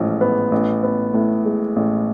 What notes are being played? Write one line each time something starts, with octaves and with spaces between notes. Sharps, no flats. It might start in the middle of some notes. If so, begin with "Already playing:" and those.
Already playing: A1 G#2 F3
B3
A1
B3
A2
G#3
A1